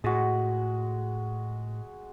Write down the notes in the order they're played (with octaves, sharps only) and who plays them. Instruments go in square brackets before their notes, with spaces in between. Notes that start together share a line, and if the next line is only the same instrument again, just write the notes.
[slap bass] A2 [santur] G#3 F#4